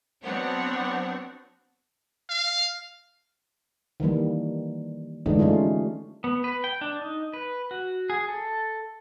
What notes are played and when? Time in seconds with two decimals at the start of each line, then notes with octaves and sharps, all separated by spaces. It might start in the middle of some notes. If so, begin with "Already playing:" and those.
0.24 F#3 B3 C4 D4 C#5 F#5
2.29 F5
4.00 D#3 E3 G3 A#3
5.26 D3 E3 G#3 A3 D4 D#4
5.39 G3 A3 C#4 F4
6.24 B3
6.44 B4
6.64 G5
6.81 D4
7.01 D#4
7.33 B4
7.71 F#4
8.10 G#4
8.29 A4